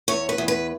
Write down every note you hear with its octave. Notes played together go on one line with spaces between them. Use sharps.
E2 C#5
B4
E2
B4